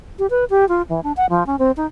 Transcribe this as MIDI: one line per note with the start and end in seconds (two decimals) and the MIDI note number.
0.19 0.26 67
0.30 0.45 71
0.50 0.67 67
0.69 0.82 65
0.89 1.00 52
1.03 1.12 62
1.17 1.26 78
1.30 1.46 53
1.46 1.58 61
1.59 1.71 60
1.77 1.86 63